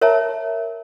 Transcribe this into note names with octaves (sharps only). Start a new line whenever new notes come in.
A#4 C#5 E5 A5 A#5